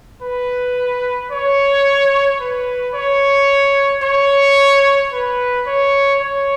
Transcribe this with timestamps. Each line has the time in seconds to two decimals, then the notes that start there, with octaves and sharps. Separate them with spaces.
0.22 B4
1.31 C#5
2.40 B4
2.94 C#5
4.03 C#5
5.13 B4
5.67 C#5
6.21 C#5